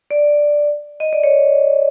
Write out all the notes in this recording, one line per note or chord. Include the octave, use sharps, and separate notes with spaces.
D5
D#5
D5
C#5